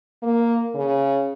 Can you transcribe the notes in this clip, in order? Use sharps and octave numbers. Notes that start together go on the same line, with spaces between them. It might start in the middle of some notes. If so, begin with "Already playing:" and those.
A#3
C#3